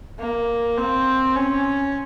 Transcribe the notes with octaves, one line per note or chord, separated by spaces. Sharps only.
A#3
C4
C#4